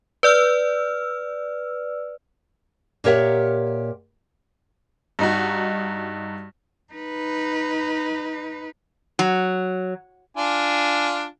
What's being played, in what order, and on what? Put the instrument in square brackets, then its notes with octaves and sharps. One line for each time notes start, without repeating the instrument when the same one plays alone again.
[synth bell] B4 D5 E6 F6
[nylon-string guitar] A#2 G4 A#4 C#5 E5 F#5
[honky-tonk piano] G2 D#4 F#4
[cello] D#4 B4
[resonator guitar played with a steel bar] F#3
[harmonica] D4 F4 G#5